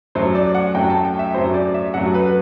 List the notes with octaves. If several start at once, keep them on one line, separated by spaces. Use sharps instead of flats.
F#2 F#3 A3 C5
D5
F#5
F#2 F#3 A3 G5
A5
G5
E5
F#2 F#3 A3 C5
D5
E5
F#2 F#3 A3 F#5
B4